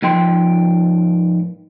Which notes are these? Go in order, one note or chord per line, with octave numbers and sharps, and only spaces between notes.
G#2 F3 G5 C6